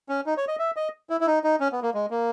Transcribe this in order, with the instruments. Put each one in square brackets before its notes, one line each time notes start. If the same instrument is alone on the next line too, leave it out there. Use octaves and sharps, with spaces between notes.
[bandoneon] C#4
D#4
C#5
D#5
E5
D#5
E4
E4
D#4
D#4
C#4
B3
A#3
G#3
A#3